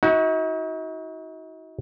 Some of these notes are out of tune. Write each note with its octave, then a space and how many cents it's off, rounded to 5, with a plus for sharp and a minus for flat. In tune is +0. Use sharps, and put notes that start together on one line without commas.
D#4 +45 F#4 +0